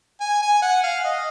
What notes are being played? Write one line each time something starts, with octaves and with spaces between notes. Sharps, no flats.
G#5
G#5
F#5
F5
D#5